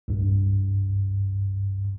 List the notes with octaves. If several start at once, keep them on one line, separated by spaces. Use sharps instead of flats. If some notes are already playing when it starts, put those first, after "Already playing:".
C2 G2